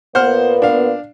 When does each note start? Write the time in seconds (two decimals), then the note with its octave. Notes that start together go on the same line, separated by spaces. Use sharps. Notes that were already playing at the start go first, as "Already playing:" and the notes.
0.15 A#2 A#3 B3 C5 F#5 F6
0.62 D4 F5